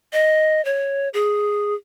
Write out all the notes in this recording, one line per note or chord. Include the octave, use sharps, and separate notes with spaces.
D#5
C#5
G#4